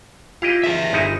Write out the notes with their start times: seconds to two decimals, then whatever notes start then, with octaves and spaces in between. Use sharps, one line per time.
0.42 E4 F4 G4 D#5
0.64 G#4 E5 A#6 E7
0.93 G1 D#4 E4